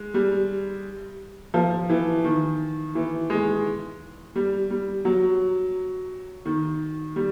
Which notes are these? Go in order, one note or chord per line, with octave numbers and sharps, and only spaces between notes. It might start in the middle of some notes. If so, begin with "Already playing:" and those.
Already playing: G#3
G3
F3
E3
D#3
E3
G#3
G3
G3
F#3
D#3
G3